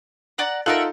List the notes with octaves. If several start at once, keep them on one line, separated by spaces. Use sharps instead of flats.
D5 F#5 A#5
D#4 F4 A4 A#4 E5 F#5